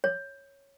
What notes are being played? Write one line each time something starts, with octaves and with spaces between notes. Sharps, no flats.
C#5